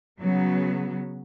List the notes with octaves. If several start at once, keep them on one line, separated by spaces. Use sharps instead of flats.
C#3 F#3 B3